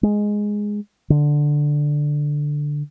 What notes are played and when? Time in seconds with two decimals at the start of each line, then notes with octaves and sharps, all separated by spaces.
0.03 G#3
1.10 D3